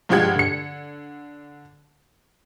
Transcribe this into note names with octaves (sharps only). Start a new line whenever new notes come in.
G2 F3 G#3 G4 F#5 G#6
D3 C#7